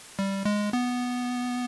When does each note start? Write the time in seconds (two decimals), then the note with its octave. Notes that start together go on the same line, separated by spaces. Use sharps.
0.19 G3
0.45 G#3
0.73 B3